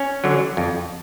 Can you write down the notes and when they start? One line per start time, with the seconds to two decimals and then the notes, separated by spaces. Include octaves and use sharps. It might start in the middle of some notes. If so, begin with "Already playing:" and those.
Already playing: C#4
0.24 D3 F#3
0.57 F2